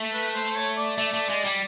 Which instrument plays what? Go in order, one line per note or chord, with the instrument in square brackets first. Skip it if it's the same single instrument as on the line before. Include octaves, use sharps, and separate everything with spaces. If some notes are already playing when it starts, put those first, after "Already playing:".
Already playing: [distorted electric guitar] A3
[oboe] B4
C5
C5
C#5
D5
[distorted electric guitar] A3
A3
G#3
G3